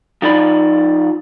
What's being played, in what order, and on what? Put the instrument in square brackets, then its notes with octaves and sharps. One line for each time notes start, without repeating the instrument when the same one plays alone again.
[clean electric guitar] F3 D#4 F4 D5 B5